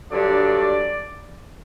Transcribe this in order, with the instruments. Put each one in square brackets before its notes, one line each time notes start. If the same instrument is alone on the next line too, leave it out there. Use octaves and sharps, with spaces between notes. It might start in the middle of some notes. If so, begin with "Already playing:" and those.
[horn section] G2 D3 F#3 D5